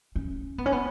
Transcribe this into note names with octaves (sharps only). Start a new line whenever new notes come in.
C#4
B3
C#4
B3